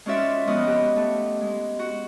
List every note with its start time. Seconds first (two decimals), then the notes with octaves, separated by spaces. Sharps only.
0.06 G#3 C#4 F4 F#4 D5 E5
0.47 F3 G#3 B3 F#4 D#5 D#6
0.67 B3 G4
0.96 A3
1.41 G#3
1.79 F#4